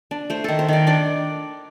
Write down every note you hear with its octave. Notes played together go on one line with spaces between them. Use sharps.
D4
A3 C5
D#3 A4
C5
D#3 D5
D4 D5